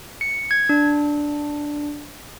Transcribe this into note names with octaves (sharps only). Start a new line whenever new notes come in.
C#7
G#6
D4